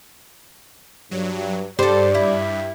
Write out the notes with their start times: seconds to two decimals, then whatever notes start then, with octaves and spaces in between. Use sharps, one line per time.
1.11 G2 F#3
1.79 G2 G4 A4 C5 D5
2.15 E4